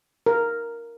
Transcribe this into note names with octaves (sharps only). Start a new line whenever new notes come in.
A#4